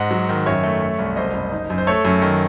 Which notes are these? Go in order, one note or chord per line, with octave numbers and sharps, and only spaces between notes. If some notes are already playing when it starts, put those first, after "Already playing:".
Already playing: G#2 D#5 F#5
F#3
D#3
F#2 C#5 E5
A3
A3
C2
F#1 C5 D#5
F#1
D#4
F#2
C5
A3 A4 C#5
F#2
D#3